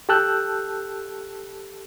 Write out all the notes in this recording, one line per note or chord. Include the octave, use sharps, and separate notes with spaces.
G4 A4 A5 E6 F#6 G6